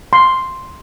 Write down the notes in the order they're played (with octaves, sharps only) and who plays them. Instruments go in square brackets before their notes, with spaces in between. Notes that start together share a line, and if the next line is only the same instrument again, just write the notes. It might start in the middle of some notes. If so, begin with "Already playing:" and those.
[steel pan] C6